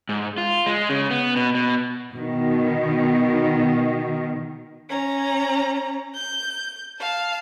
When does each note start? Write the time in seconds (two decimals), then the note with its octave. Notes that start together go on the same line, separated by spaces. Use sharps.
0.09 G#2
0.38 F4
0.66 G#3
0.89 C#3
1.11 B3
1.36 B2
1.55 B2
2.13 B2 D#3
4.89 C#4 A#5
6.14 G6
7.00 F5 A5